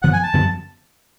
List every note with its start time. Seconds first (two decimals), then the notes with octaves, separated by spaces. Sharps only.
0.02 F#2 D3 F3 B3 F#5
0.13 G#5
0.23 A5
0.34 F#2 D3 F3 B3